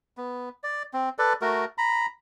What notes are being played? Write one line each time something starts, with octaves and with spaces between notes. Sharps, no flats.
B3
D5
C4
A4 B4 D5
A3 F#4 A#4
A#5 B5